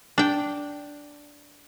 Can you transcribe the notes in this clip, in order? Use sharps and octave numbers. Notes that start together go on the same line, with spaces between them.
D4 G5